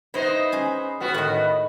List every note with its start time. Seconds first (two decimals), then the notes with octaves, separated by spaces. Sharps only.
0.14 B3 D#4 E4 C5 D#5
0.52 C#4 G#4
1.00 G#2 B3 F#4
1.14 A2 D#3